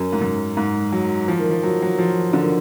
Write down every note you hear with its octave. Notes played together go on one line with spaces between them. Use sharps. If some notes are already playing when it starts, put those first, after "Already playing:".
Already playing: F#2
G#2
F#2
G#2
F#3
F3
D#3
F3
F#3
F#3
F3
D3
D#3